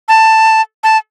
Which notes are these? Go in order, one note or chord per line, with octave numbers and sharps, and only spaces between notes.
A5
A5